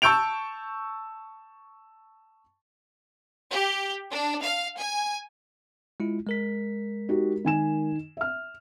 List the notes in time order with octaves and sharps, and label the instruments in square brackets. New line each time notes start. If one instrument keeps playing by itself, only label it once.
[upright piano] A5 C#6 E6 G6 D7 F7
[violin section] G4
D4
F5
G#5
[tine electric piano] G#3 E4 F4
G#3 A#4 B6
[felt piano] D#4 F#4 G4
D#3 G#5 E7
E5 F6